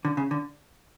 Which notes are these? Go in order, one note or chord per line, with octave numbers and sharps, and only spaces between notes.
D3
C#3
D3